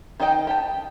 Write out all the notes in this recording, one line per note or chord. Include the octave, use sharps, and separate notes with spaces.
D#3 D#4 C5 D#5 G5
G4 G5 A5